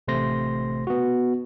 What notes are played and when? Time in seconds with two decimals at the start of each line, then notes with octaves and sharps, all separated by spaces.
0.08 A1 C3 A3 C5 C6 A#6
0.87 B3 F#4